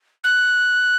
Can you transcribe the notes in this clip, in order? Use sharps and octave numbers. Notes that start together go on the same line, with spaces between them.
F#6